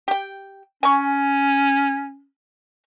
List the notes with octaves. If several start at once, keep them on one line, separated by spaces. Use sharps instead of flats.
G4 G5
C#4 G#5 A#5 C#6